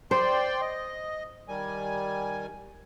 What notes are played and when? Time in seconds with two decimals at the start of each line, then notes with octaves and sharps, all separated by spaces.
0.11 C5 D5 G5 C6
0.61 D#5
1.48 D#3 G3 G#5